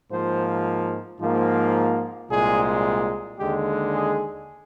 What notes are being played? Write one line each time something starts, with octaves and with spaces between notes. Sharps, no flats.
G#2 F3 A#3 C5
G#2 F3 A#3
C2 A#2 G#3 G#4
D#2 D3 G#3 G4
G#4